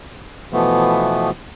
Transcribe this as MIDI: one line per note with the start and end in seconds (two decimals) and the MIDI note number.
0.53 1.30 47
0.53 1.30 52
0.53 1.30 53
0.53 1.30 57
0.53 1.30 59